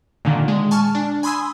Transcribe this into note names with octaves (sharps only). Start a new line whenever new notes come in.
A#2 D3 D#3
G#3
G#5 A5 C#6 F6
D4
G#5 B5 C6 D#6 E6 G#6